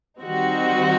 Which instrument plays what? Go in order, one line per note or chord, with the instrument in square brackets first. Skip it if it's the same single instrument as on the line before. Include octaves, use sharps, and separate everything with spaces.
[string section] D#3 G3 C4 D#4 F#4